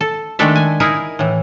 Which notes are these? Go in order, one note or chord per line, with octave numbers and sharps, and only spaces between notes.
A4
D#3 G#3 A3 D4 A4 E5
G#5
D#4 E4 G#4 A#4
A2 E3